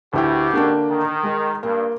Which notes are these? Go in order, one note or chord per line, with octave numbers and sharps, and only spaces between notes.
D2 B2 E4 G4 G5
D3 A#3 D4
D#3
G#3 A#4
G2 A#3